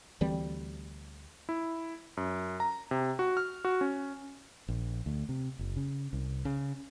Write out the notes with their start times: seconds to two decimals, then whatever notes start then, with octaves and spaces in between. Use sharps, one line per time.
0.21 D2 E3 G3 C4
1.49 E4
2.17 F#2
2.60 A#5
2.91 C3
3.19 F#4
3.37 F6
3.65 F#4
3.81 C#4
4.68 A#1
5.06 D2
5.29 C3
5.59 F#1
5.77 C#3
6.13 C2
6.45 C#3